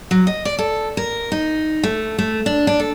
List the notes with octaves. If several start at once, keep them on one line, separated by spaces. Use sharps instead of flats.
F#3
D#5
D5
A4
A#4
D#4
A3
A3
D4
D4
A4